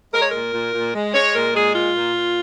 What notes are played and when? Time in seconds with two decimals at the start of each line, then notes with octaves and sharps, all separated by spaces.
0.14 G#3 A#4
0.22 C#5
0.30 A#2 A#4
0.53 A#2
0.74 A#2
0.94 G#3
1.14 G#3 C#5
1.34 A#2 A#4
1.54 G#3 G#4
1.74 A#2 F4
1.95 A#2
2.15 A#2